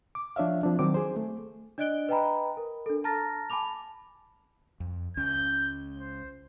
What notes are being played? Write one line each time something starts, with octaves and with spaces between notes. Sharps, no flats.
D6
F3 D4 C#5 E5 F5
F3 C4 D4
D#3 F#3 C4 D6
G#4 C5
A3
D4 D5 D#5 F#6 D7 G7
B4 D#5 G5 G#5 A#5 B5
A#4
D4 A4
A5 A#5 F6 A6 A#6
G#5 A5 B5 D6 F7
F2
C#2 C#4 G6
C5